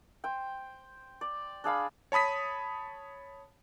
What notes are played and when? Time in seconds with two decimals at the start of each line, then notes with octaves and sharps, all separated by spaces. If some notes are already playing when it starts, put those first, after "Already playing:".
0.24 C5 G5
1.21 D5
1.64 D4 G#4 F5 B5
2.12 C#5 A5 B5 D#6 B6